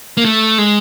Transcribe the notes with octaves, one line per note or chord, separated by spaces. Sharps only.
A#3
A3
G#3